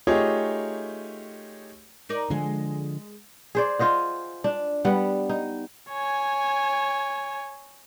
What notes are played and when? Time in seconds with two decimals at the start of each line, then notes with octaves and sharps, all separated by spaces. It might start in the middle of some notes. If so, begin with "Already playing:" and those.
0.07 A3 D#4 F4 G4 G#4 C#5
2.09 D#4 A#4 D5
2.30 D3 F3 G#3 G#4
3.55 G#4 C5 D5
3.79 F4 C5 D#5 F#5
4.44 D4
4.85 G3 B3 F#5
5.29 D#4
5.89 C#5 G#5